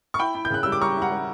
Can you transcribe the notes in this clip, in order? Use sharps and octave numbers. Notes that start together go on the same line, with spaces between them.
C#6
E4 G5 B5
E4
G6
C#3 F#6
G3 E6
D6
G3 A#5 C#6
E4
F#5 A#5
G3